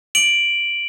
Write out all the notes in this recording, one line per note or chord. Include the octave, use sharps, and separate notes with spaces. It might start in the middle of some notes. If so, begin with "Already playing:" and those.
D7 F#7